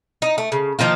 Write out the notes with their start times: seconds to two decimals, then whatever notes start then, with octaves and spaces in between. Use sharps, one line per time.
0.22 D#4
0.38 A3
0.52 C#3
0.79 D#3 F3 A#3 F4